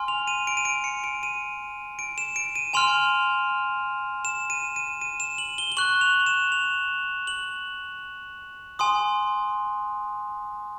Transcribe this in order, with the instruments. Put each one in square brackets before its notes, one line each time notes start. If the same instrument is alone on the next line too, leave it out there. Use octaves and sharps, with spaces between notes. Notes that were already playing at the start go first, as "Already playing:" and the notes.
Already playing: [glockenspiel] G#5 C6 F6
F7
D#7
D7
D#7
D7
C#7
D7
D#7
D7
E7
D7
D#7
G#5 C6 F6 F7
E7
D#7
D#7
D#7
E7
F#7
G7
G7
C#6 F#6 F#7
F7
E7
F7
F#7
G#5 C6 D#6